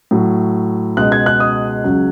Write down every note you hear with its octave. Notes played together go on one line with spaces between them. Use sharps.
A2 F#3
C#2 B2 G#3 F#6
G#6
F#6
D#6
C#2 C#3 F#3